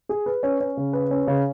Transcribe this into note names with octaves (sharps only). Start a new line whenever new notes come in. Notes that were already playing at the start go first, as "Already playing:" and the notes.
G#4
B4
C#4
C#4
C#3
B4
C#4
C#3